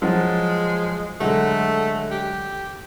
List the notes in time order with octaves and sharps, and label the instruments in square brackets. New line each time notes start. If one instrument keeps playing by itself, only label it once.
[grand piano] F3 F#3 F4 [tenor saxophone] G#3
[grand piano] D3 F#3 G#3 [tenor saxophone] A3
[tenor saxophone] G4